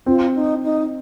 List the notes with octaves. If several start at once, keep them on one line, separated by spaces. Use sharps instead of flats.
C4 F4
D#4
D#4